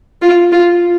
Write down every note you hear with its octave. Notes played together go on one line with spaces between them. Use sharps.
F4
F4